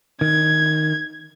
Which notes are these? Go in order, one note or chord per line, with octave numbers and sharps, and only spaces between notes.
D#3 G#6